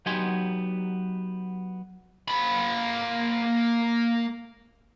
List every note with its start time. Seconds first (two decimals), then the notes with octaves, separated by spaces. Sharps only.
0.06 F#3 B3 D#4 G4 G#5 C6
2.28 A#3 B5